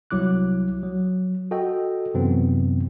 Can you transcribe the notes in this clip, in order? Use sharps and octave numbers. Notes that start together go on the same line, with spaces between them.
C2 F#3 E4 D6 F#6
F#3
F#4 A4 D#5 G5
F#2 C3 E3 B3 C4